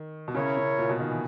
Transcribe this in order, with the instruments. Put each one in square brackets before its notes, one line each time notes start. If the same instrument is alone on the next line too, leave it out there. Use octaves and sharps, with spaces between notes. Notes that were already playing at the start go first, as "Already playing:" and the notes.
Already playing: [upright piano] D#3
B2
[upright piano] C#3 [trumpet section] E4 A#4 C#5
[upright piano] C#3
A#2
B2
D#3
E3